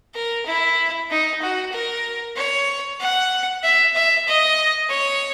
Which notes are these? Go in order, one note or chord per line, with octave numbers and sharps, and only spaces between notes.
A#4
E4
D#4
F#4
A#4
C#5
F#5
E5
E5
D#5
C#5